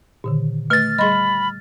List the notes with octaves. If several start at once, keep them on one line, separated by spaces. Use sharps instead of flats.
A#2 D3 D#3
A3 B4 F6 A6
G3 G#4 D#5 B5 C6